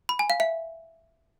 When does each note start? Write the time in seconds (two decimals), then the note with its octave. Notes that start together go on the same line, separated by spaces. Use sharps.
0.09 B5
0.19 G#5
0.30 F5
0.40 E5